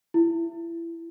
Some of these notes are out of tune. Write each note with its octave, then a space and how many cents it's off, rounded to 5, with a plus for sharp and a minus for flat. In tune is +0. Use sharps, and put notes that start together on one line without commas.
E4 +25